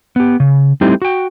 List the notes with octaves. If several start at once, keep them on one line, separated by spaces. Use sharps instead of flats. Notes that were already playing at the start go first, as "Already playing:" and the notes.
B3 G4
C#3
G3 A3 C4 D#4 E4 G4
F#4 G5